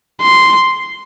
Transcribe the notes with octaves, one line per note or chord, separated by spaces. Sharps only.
C6